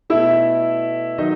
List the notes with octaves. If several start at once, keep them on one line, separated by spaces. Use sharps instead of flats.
B2 A3 E4 E5
D#3 F#3 D#4 D#5